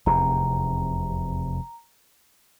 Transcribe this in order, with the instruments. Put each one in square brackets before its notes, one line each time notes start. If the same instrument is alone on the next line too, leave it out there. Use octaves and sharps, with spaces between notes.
[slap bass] F1 E2 C3 [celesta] A#5